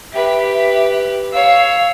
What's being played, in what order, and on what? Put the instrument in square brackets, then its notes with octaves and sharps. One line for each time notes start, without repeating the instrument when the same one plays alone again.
[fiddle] G4 B4 [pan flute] E5
[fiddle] C#5 E6 [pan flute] F5